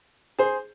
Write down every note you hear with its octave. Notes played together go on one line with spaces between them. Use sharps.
G#4 C5